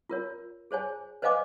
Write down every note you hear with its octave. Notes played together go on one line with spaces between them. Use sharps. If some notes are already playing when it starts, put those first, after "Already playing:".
F4 A#4 C#5
G#4 C5 C#5 G#5
B4 C5 D#5 F5 G#5 D6